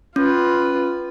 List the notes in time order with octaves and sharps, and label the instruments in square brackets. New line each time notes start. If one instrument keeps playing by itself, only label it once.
[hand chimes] C#4 [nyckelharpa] F4 B4